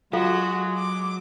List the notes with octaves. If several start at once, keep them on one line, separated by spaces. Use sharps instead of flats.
F#3 G#3 F4 F#4 A4 F5
D6